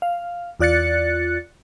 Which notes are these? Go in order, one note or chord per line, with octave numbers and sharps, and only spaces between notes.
F5
E2 F4 D5 F#6 A6 C#7